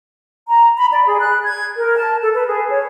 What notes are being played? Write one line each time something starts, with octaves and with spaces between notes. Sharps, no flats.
A#5
B5
D5
G#4
F#6
G#6
A#4
A5
A4
B4
G#4
C#5